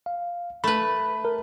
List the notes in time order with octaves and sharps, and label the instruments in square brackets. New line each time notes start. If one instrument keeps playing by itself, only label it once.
[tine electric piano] F5
[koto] A3 B4 [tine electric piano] B5
[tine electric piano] A#4